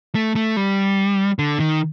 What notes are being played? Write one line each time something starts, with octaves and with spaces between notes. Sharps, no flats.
A3
A3
G3
D3
D#3